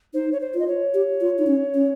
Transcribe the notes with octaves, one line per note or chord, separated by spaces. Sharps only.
D#4 C5
C#5
C5
F4 D#5
C#5
G4
F4
D#4
C#4
C#4